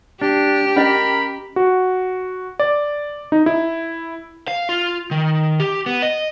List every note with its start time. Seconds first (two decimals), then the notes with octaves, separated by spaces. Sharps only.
0.21 D4 G4
0.76 C#4 A#4 D#5 B5
1.56 F#4
2.59 D5
3.32 D#4
3.46 E4
4.48 F5
4.69 F4
5.11 D#3
5.60 G4
5.86 B3
6.02 D#5